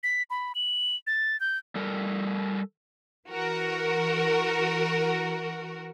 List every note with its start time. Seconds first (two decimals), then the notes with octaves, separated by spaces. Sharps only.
0.03 B6
0.30 B5
0.55 F#7
1.07 A6
1.40 G6
1.75 G3 A4 A#4
3.29 E3 F#4 A#4